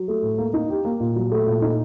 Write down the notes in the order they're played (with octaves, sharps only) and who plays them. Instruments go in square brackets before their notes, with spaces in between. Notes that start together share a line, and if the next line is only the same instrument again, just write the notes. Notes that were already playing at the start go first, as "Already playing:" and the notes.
Already playing: [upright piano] F#3
A3
A2
A#3
D#4
G4
A#3
A#2
F#3
A3
A#2
D#4